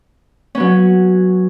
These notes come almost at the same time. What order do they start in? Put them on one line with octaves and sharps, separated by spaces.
C#4 B3 F#3